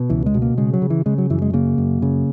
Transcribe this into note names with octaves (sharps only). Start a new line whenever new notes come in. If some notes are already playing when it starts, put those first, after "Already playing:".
Already playing: B2
C#2 E3
G#3
B2
A#3
C#3 G#3
F#3
C#3
E3
C#3 G#3
F#3
F#2 E3
G#3
C#3 A#3
F#2
C#3